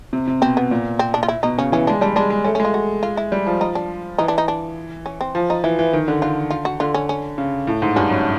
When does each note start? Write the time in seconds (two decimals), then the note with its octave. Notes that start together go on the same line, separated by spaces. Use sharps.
0.13 C3
0.27 C3
0.41 B2 C4
0.57 B3
0.71 A#2
0.99 C4
1.14 D4
1.23 F4
1.28 E4
1.43 B2 D#4
1.58 C#3 C#4
1.72 E3 C#4
1.87 G#3 D4
2.01 G3 D4
2.16 G#3 D4
2.30 G#3
2.44 A3 C#4
2.55 C#4
2.60 G#3 F4
2.74 F#4
3.03 F4
3.17 E4
3.32 G3
3.47 F3
3.61 D#4
3.75 D4
4.18 E3 D#4
4.28 D4
4.38 D#4
4.48 D4
5.06 C#4
5.21 C4
5.35 F3
5.50 D#4
5.64 E3 E4
5.79 E3
5.93 D#3
6.08 D3
6.22 D3 F4
6.50 F4
6.65 F#4
6.80 D3 F4
6.94 C#4
7.09 C#4
7.38 C#3
7.67 A2
7.82 G#2
7.96 G2 C#4
8.10 F#2